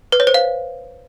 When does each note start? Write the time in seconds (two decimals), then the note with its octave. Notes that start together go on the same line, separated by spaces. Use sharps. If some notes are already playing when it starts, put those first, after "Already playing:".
0.12 B4
0.20 C#5
0.27 C5
0.34 F5